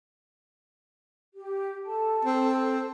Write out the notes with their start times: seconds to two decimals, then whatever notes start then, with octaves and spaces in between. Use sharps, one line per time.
1.35 G4
1.84 A4 A5
2.25 C4